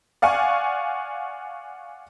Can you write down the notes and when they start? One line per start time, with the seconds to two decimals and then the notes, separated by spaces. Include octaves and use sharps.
0.22 D5 F5 F#5 G#5 C#6